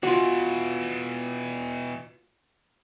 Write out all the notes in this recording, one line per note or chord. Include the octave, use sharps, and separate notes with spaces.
B2 E3 F4 F#4